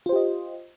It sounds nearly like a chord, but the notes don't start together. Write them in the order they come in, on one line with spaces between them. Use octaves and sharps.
F4 C5 G4 D#5